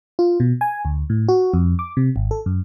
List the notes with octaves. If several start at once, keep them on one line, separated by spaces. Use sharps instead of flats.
F4
B2
G#5
D2
A2
F#4
F2
D6
C3
G#1
A4
F#2